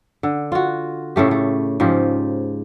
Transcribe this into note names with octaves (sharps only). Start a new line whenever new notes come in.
D3
F4 F#4
A2 C#3 A3 G4
A3
G#2 C#3 F3 G4